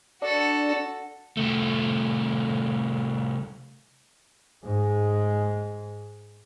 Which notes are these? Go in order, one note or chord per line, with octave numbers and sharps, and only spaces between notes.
D4 F#4 A4
C2 A3
G#2 G#3